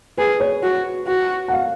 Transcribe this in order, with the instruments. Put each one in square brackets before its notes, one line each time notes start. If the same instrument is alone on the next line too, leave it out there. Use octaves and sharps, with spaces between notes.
[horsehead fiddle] G#4 [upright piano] B4
[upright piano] C#5
[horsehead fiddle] F#4
F#4
[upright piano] F#5
F5